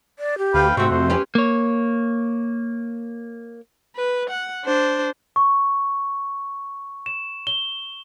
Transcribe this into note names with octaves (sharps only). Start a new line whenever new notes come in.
D5
G4
D2 B4 F5 G5
G#2 C3 A3 C4 F#4 C6 C#6
F2 C5
C#4 G4 B4
A#3 C#5
B4
F#5
D4 C5
C#6
E7
G7